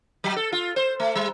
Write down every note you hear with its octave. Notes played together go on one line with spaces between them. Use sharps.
F#3
A4
F4
C5
A3
G3